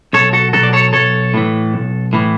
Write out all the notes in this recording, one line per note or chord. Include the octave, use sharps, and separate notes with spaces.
B1 A4 C#5
F#4 A4
B2 F#3 F#4 A4
D5
A4 C#5
B1 A4 C#5
A2 E3
B1
A2 E3